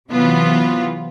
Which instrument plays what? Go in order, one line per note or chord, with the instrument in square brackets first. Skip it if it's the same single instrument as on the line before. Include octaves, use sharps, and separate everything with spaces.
[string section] C3 E3 F#3 B3 F4